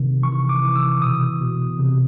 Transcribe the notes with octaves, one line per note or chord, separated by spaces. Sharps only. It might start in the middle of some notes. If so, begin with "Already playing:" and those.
Already playing: C3 D#3
E3 C#6
D6
E3
E6
B2 D#6
B2
C3